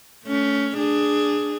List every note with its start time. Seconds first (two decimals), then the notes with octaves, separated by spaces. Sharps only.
0.25 A3 C#4
0.76 D4 G#4